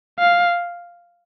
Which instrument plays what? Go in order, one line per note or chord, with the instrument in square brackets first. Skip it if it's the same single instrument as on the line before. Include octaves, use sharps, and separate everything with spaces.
[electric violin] F5